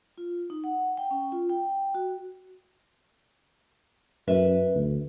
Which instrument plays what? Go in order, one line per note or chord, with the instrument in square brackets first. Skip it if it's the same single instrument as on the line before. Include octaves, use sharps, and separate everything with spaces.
[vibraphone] F4
D#4
F#5
G5
C#4
F4
G5
F#4
[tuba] F#2 [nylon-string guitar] B4 E5
[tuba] D2